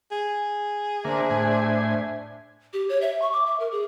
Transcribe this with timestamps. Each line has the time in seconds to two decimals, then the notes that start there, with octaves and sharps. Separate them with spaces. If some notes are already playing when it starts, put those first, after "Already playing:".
0.12 G#4
1.05 D3 A#3 D4 C5 E5
1.30 A2 G#5
2.73 G4
2.89 C#5
3.02 E5
3.22 C#6
3.33 D6
3.46 E5
3.60 A#4
3.72 G#4